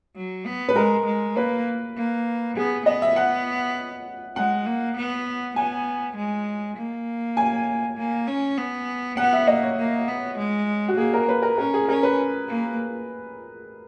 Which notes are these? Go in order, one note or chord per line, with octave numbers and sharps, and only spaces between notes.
F#3
B3
B4
G#3 A#4
G#3
A#3 B4
A#3
B3 G#4
B3 D#5
E5
F#5
G#3 F#5
A#3
B3
B3 G#5
G#3
A#3
G#5
A#3
C#4
B3
B3 F#5
E5
A#3 D#5
C#5
A#3
B3
G#3
F#4
A#3 G#4
A#4
B4
A#4
C#4 A#4
G#4
C#4 A#4
B4
A#3